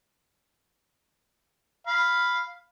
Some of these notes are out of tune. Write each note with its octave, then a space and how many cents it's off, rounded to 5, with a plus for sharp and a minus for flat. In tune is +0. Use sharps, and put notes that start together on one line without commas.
F5 +0 B5 +0